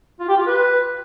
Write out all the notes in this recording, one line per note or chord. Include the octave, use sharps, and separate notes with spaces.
F4
G4
F4
B4